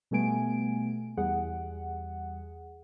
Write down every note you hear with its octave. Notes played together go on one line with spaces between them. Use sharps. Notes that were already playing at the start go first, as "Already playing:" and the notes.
B2 G3 A3 B3 G#5 D7
E2 G3 G#4 F#5